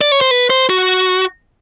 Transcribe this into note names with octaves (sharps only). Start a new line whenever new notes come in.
D5
C#5
C5
B4
C5
F#4